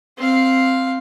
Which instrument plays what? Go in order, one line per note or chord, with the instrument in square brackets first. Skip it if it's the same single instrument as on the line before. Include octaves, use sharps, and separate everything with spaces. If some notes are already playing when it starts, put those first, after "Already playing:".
[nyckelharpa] C4 F5